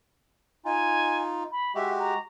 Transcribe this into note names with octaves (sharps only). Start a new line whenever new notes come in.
D#4 F4 G#5
B5
G#3 F#4 G4 E5
A#5